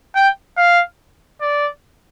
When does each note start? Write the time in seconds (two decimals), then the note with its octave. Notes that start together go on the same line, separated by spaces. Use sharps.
0.15 G5
0.57 F5
1.41 D5